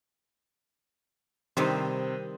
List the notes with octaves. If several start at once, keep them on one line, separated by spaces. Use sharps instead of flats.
C3 D#3 G3 C4 C5 D#5 C6